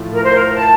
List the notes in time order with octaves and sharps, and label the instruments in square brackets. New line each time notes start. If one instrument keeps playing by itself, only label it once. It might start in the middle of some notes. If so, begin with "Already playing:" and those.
Already playing: [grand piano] A2 F3 A3
[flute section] A#4
C5
A#4
A5